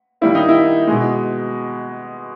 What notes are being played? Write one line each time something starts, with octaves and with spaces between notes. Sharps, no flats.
D#3 G3 A#3 E4
D#4
E4
B2 G#3